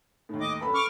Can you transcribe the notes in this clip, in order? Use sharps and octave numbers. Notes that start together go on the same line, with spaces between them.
D#2 A2
D#5 D6
F#2 A4 B4 B5
C#6 D6 F6